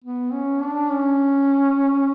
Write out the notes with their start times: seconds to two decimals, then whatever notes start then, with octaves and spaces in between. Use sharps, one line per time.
0.04 B3
0.33 C#4
0.62 D4
0.92 C#4